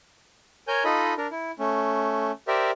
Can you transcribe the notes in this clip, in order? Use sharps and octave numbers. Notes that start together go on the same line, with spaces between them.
A#4 C#5 G#5 G6
D#4 F4 A4 D#5 B5
D4 A#4
E4
A3 C#4
G4 A#4 C5 D5 E5